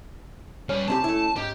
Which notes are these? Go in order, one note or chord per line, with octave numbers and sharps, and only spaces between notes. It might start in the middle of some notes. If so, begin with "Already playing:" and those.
G3 C#4 B4
C2 C4 G4 A5
A3 E4
G#2 G4